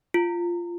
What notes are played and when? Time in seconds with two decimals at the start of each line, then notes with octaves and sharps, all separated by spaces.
0.14 F4